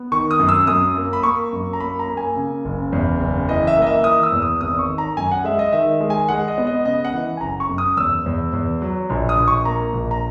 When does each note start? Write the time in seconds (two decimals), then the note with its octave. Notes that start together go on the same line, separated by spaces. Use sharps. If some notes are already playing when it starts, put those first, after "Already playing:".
Already playing: B3
0.12 D#3 C#6
0.31 D#6
0.39 F#2
0.49 E6
0.67 F#2 D#6
0.96 A#3
1.13 B5
1.23 A#3 C#6
1.53 F#2
1.73 A#5
1.80 A#3 B5
1.99 A#5
2.08 A#3
2.17 G#5
2.36 C#3
2.65 F#1
2.93 E2
3.21 F#1
3.48 E3 D#5
3.67 E5
3.77 A#3 D#5
3.87 E5
4.04 E3 D#6
4.23 E6
4.32 E2
4.42 D#6
4.61 G#1 D#6
4.79 C#6
4.89 D#3
4.98 A#5
5.17 F#2 G#5
5.32 F#5
5.44 G#3 E5
5.59 D#5
5.73 D#3 E5
6.00 G#3
6.10 G#5
6.29 G#3 F#5
6.48 D#5
6.58 B3
6.67 D#5
6.85 C#3 D#5
7.05 F#5
7.14 E3
7.37 G#5
7.41 F#1 A#5
7.60 C#6
7.69 F#2
7.78 D#6
7.97 E2 E6
8.26 E2
8.53 E2
8.82 F#3
9.10 A#1
9.29 D#6
9.38 A#1
9.48 C#6
9.65 A#3 A#5
9.94 A#1
10.11 A#5